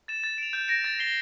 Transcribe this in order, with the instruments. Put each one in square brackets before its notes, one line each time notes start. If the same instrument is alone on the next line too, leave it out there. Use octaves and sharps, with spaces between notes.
[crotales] A6 E7
A6
D7 F7
G6
A#6 D7
A6
C7 G7